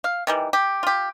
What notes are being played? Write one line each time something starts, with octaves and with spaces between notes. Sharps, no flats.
F5
D#3 E3 G3
G4
F4 G4